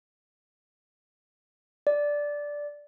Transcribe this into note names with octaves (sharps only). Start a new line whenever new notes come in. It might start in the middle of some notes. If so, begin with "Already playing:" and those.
D5